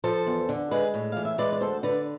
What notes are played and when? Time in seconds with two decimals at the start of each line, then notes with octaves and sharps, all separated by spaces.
0.04 F3 A4 C5
0.27 E2
0.49 D3
0.71 G#3 G#4 B4
0.94 A2
1.12 E3 F5
1.25 E5
1.38 G#3 B4 D5
1.52 D5
1.61 D2 A4 C5
1.83 D3 B4 D5